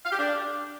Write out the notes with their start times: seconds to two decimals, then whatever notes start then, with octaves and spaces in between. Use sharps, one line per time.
0.05 F5
0.12 G4
0.19 D4